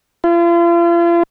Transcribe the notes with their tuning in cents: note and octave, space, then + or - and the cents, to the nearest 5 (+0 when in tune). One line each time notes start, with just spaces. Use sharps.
F4 -40